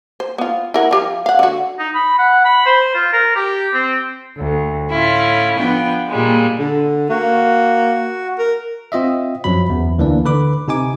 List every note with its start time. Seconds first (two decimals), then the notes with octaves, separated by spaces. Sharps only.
0.20 C5
0.38 B3 F4
0.74 E4 A#4 F#5
0.91 F3 G4 F5
1.26 F5 F#5
1.39 D3 F#4
1.79 D#4
1.94 B5
2.18 F#5
2.44 B5
2.66 C5
2.95 F4
3.13 A#4
3.35 G4
3.73 C4
4.37 D2
4.91 A2 C#4 E4 F4
5.57 F3 B3 D4 G5
6.09 A#2 G3 G#3
6.59 D3
7.10 A#3 F#4
8.39 A#4
8.92 C4 F4 D#5 E5
9.44 F#2 F3 F#3 B5
9.70 E2
9.98 D2 E3 A#3 D4 D5
10.25 D3 B4 B5 D6
10.68 C3 D#4 G#5 D6